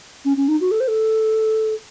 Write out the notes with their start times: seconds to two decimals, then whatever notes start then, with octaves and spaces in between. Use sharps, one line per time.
0.25 C#4
0.37 C#4
0.48 D#4
0.61 F#4
0.71 A4
0.80 C5
0.88 A4